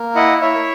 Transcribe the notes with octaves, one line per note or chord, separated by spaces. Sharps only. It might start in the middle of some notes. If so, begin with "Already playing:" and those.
Already playing: A#3
E4 D#5 F#5
E4 C#5 E5